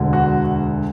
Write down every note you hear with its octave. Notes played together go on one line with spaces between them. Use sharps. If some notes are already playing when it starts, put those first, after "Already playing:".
Already playing: E1 D2 D3
F#4